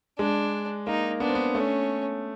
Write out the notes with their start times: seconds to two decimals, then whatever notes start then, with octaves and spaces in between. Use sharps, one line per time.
0.19 G#3 D4
0.87 A#3 D#4
1.20 B3 D4
1.29 C4
1.35 B3
1.55 A3 C#4